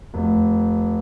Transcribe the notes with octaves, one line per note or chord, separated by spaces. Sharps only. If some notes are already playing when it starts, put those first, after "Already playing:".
F1